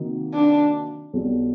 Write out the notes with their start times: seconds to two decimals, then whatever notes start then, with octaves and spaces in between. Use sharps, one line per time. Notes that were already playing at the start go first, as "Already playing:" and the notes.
Already playing: C3 D#3 F#3 A#3 D#4
0.34 D4
1.13 B1 B2 G3